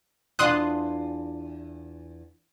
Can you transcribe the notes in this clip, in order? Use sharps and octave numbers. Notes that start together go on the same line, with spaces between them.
E2 D4 F4 C6 D#6 F#6